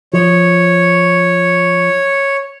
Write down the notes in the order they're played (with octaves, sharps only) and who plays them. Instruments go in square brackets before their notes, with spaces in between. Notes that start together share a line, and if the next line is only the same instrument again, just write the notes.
[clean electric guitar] F3 [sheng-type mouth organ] C#5